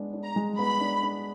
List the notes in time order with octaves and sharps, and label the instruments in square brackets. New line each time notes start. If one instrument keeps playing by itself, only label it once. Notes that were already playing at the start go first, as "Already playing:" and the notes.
Already playing: [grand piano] G#3 B3 D4
D4
[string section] A#5
[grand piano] G#3
[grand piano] B3 [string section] B5
[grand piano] D4
D4